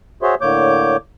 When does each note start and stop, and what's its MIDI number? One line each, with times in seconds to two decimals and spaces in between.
0.22 0.35 66
0.22 0.35 68
0.22 0.35 72
0.22 0.35 73
0.22 0.35 76
0.22 0.35 84
0.41 0.97 45
0.41 0.97 50
0.41 0.97 58
0.41 0.97 73
0.41 0.97 86
0.41 0.97 91